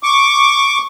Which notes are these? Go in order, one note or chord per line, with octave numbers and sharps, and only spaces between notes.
C#6 D6